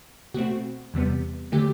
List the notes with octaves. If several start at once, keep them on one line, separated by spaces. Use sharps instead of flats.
B2 A3 C4 F#4
E2 C3 G3 B3
D3 F#3 A3 G4